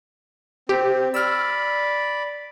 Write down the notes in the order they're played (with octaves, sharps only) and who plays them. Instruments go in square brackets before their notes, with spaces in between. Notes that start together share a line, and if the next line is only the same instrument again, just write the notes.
[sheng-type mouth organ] C4 [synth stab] G4
[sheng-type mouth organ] D5 B5 [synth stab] E6 F6